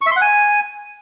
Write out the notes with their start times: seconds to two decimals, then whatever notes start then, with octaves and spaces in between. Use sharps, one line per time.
0.01 C#6
0.06 E5
0.11 C6
0.16 F#5
0.21 G#5